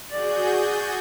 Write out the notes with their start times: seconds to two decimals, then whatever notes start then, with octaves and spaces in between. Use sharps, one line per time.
0.11 F#4 G#4 D5 G6